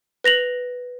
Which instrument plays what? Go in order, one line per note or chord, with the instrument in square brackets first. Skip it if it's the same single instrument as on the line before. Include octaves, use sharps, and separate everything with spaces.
[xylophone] B4 A#6 F7 F#7